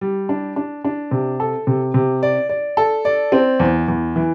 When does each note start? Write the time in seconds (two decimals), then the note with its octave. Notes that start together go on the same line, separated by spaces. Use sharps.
0.01 G3
0.29 D4
0.56 D4
0.84 D4
1.11 C3
1.40 A4
1.67 C3
1.94 C3
2.23 D5
2.49 D5
2.77 A4
3.05 D5
3.32 C4
3.60 E2
3.88 E2
4.16 E3